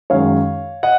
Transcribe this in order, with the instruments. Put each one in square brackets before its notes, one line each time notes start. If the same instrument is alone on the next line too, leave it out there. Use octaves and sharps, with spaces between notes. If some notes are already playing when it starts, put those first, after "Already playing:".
[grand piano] F#2 D#3 G#3 C#5 F5
D#5 F#5